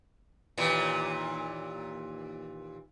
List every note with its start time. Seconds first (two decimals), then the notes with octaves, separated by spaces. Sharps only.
0.58 D#2 A#2 E3